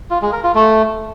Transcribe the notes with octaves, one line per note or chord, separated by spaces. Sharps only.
F4
G#3
A#4
F4
A3